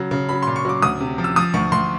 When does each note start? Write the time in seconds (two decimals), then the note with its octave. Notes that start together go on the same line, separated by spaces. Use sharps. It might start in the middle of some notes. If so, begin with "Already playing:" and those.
Already playing: C#3 F#3
0.11 C#3
0.29 F#3 B5
0.43 A#2 C6
0.56 C#6
0.65 F#3 D6
0.82 D2 D#6
1.00 C3
1.18 F3
1.24 E6
1.36 F3 D#6
1.54 D2 C#6
1.72 D2 C6